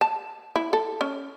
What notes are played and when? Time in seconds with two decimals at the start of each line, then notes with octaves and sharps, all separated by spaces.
0.01 A5
0.56 E4
0.73 A4
1.01 C#4